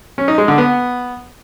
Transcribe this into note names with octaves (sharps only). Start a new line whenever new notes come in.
C#4
D#4
G#3
D3
B3